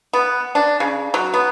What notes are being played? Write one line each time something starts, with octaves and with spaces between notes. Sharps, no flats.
B3
D4
C#3
F#3
B3